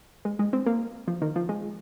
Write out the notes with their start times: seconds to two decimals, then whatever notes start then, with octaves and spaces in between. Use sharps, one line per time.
0.25 G#3
0.39 G#3
0.53 C4
0.66 A#3
1.08 F3
1.22 D#3
1.36 F3
1.49 G#3